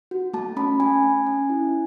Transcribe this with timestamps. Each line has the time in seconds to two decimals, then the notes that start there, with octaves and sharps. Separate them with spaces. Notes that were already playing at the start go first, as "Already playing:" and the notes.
0.11 F#4
0.34 A3 A5
0.57 C#4 B5
0.80 A3 G#5
1.03 C#4
1.26 C#4
1.50 E4